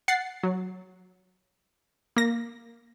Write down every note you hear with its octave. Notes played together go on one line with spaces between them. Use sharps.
F#5 A6 C7
F#3
A#3 A#6